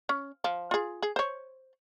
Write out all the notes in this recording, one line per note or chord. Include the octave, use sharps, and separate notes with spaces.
C#4
F3
F4 G#4
G#4
C5 C#5